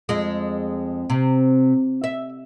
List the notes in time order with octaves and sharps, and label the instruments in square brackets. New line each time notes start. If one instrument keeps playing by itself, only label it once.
[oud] F2 G#3
C3
E5